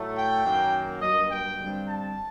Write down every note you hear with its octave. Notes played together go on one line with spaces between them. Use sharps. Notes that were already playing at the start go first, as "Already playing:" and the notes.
Already playing: A2 F#3 A3
G5
F#2 D#3 F#3 A#3
G2 F#3 A#3 D#5
G5
G2 D3 G3 C4
A5